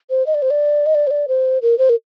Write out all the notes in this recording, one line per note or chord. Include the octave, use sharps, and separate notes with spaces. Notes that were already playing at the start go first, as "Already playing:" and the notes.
C5
D#5
D5
C5
D5
D#5
D5
C5
D5
C5
A#4
C5
A#4